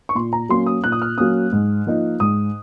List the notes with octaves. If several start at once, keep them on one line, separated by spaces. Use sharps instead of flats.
C#6
A#2 C6
A#5
F#3 A#3 C#4 C6
D#6
A#2 F#6
D#6
F6
F#3 A#3 C#4 D#6
G#2
F3 A#3 D#4
G#2 D#6